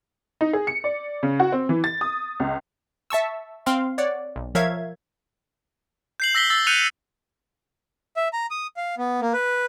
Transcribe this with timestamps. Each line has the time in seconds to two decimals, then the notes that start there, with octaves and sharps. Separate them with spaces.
0.41 D#4
0.53 G#4
0.67 C#7
0.84 D5
1.23 C#3
1.40 F#4
1.52 C4
1.69 E3
1.84 A6
2.01 D#6
2.40 C#2
3.10 E5 A5 C#6 E6
3.66 C4 F5 C6
3.98 C#5 D5 F#5
4.36 B1
4.55 F3 A#4 C#5 E5 F5 G#6
6.20 G6 C7 F#7
6.35 E6 A#6 B6 G7
6.50 E6 A6
6.67 F#6 G6 C#7 D#7 F7
8.17 E5
8.33 A#5
8.51 D#6
8.77 F5
8.98 B3
9.21 A#3
9.33 B4